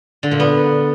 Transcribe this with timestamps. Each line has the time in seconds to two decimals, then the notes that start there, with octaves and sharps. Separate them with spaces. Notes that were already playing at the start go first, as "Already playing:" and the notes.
0.23 D3
0.31 A#2
0.40 B3